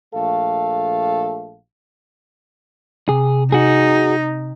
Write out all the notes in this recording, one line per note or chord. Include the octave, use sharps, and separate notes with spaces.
A#1 A3 A4 F5
C3 G#4
D#4 F#4 G#4